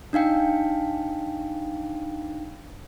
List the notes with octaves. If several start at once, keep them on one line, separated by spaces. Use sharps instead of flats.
D4 D#4 F5 G5